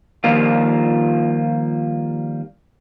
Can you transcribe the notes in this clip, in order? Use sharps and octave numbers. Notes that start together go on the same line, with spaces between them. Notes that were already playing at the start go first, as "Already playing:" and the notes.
D#3 F3 G3 A#3 F4